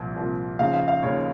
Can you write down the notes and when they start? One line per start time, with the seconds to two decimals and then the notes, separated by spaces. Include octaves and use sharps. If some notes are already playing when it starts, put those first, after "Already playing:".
Already playing: C2 A#2 F3
0.17 C2 A#2 F3
0.59 D#2 C#3 F3 F5
0.74 F5
0.88 F5
1.03 D#2 C#3 F3 C#5